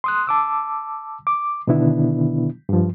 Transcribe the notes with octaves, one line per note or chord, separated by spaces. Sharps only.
C6 D#6 F#6
A5 D6 E6
D6
B2 D3 D#3 B3 D4 E4
G2 F3